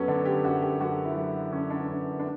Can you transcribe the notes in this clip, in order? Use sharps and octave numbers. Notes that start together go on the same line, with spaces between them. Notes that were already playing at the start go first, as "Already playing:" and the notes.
Already playing: F#2 F#3 B3 C#4 A4
D3 D4
G4
F#2 F#4
G4
F#2 F#4
E4
F#3
D3 C#4
D4
F#2 C#4
D4